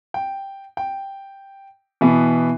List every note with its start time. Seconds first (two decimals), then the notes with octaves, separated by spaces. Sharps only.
0.14 G5
0.77 G5
2.01 B2 E3 B3